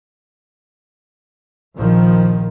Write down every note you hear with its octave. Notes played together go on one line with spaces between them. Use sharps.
A#1 D#3 F3